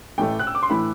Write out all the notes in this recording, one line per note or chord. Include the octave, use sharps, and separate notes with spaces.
A1 A2 E3 A3 G5
F#6
E6
D6
C6
A2 E3 A3 B5